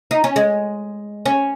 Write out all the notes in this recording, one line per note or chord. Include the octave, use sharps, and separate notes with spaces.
D#4
C#4
G#3
C#4